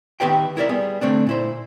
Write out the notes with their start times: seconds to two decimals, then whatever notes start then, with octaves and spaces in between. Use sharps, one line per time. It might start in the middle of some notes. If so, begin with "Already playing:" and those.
0.20 D#3 B3 G4 B4 E5 G5
0.57 E4 A#4 D5 E5
0.69 G3 B3 G#4
1.01 D3 A3 C4 D4
1.27 A#2 E4 C5